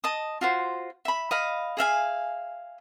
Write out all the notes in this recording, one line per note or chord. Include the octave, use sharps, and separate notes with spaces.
D#5 A5 D#6
F4 F#4 C5
E5 B5
D#5 F5 B5
G#4 E5 F5 G#5